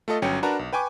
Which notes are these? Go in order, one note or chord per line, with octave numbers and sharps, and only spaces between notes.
A3 F4 A4 D#5
G1 F#3 C#4 G5 C#7
D4 F#4 A#4 B4 A5 A#5
B1
B4 G5 G#5 C#6 D6